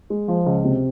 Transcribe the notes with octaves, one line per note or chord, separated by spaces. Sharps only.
G#3
F3
C#2
C3